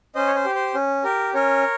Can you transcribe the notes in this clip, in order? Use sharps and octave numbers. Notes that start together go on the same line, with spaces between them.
C#4 C5 D#5
C#5
C5
G4
C5
C#4
G4 A#4
C#4 A#4 C#5